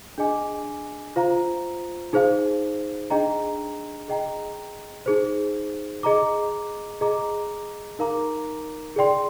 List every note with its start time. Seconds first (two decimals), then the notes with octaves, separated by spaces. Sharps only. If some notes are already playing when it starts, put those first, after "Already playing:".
0.18 D4 G#4 D#5 G#5 D6
1.16 F4 C5 F5 A#5
2.13 D#4 G#4 C5 F5
3.10 D4 G#4 D#5 G5 A#5
4.08 G#4 D#5 G5 A#5
5.06 D#4 G#4 C5
6.03 G#4 D#5 A#5 D6
7.01 G#4 D#5 A#5 D6
7.99 D#4 A#4 F5 A#5 D6
8.96 G#4 D5 G5 C6